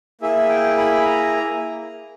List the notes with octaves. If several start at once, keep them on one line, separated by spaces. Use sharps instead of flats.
A#3 E4 G#4 E5
G5
B5
B5
A#5